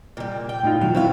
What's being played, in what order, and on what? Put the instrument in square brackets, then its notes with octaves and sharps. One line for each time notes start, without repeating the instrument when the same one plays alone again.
[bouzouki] A#2 G3
G5
[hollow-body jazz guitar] A2 D#4 F4
[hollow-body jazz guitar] B2 D#3 F#3 [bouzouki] F5
[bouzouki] F#3 B3 F5 [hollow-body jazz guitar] C4 E4 C5